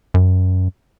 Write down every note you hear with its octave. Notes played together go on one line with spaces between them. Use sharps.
F#2